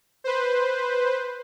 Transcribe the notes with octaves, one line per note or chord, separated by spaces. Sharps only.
B4 C5